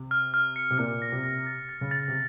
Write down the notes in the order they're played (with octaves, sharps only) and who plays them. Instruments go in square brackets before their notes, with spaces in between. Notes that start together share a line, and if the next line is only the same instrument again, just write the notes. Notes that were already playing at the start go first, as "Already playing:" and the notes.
Already playing: [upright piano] C3
[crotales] F6
F6
C#7
[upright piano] C3
[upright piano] A#2 [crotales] F6
[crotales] A#6
[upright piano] C3
[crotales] A#6
A6
A6
[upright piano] C#3
[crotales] A6
[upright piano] C3